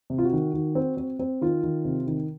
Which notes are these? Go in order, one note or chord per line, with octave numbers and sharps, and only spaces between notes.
C3
F4
F#4
D#3
D#3
C4
C4
C4
D#3 F4
D#3
C3
D#3